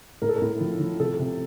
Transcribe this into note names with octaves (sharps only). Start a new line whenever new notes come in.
A2 A#4
A4
A#4
A2
F3
F3
C3 A4
C3